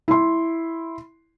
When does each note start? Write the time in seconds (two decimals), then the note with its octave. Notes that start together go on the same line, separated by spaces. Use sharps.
0.08 E4 C6